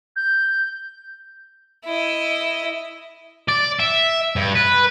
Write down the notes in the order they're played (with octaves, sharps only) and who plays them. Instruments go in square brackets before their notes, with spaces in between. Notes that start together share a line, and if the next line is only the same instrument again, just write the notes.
[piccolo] G6
[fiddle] E4 D#5
[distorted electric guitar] D5
E5
G2
B4